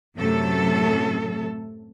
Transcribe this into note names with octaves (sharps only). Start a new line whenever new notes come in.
F#2 A2 C3 F#3 A3 A4